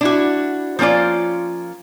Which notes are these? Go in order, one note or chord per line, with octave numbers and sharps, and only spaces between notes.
D4 E4 F#4
F3 A#3 C#4 F4 D5